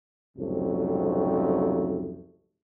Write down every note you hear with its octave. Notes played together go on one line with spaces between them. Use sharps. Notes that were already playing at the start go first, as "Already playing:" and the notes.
C2 F2 G#2 C#3 F#3 A3